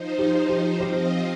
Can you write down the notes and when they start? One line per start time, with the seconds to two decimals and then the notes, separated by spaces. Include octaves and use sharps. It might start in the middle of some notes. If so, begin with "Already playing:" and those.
Already playing: F3 D#4 C5
0.19 G4
0.49 G4
0.80 F3 C4 F4 G4 C5 D#5